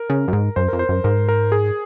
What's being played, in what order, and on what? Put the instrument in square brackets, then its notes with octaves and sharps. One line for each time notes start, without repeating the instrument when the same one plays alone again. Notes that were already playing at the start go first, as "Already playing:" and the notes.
Already playing: [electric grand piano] A#4
[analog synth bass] C#3
F#2
G#2
[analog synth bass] F#2 [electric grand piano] C5
[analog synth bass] F2 [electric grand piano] A#4
[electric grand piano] C5
[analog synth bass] F#2
[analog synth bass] G#2 [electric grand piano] A#4
[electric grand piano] A#4
G#4